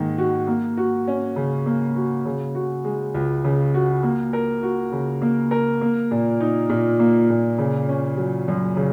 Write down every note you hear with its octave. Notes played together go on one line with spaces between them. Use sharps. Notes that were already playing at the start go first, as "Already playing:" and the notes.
Already playing: G#2 D#3 A#3
F#4
A#3
F#4
C#4
C#3
A#3
F#4
C#3
F#4
G#3
C#2
C#3
F#4
A#3
A#4
F#4
C#3
A#3
A#4
A#3
A#2
D#4
A#2
A#3
A#2
C#3
C#4
F#3
F#2
C#3